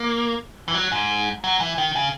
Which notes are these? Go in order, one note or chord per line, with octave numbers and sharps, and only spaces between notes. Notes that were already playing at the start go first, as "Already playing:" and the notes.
Already playing: A#3
E3
F#3
G#2
F#3
E3
D#3
C#3